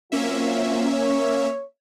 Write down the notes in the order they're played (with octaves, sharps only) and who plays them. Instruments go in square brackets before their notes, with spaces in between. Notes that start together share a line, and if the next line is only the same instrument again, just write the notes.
[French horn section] F#3 C4 F4 [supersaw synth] A#3 C#4 E5
[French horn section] C#5